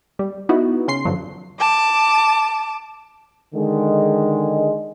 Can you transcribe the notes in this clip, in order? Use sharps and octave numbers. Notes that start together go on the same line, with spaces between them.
G3
B3 D#4 E4 F#4
C#3 C6 C7
G2 D3 F3 F#3
A5 D6
D3 D#3 G#3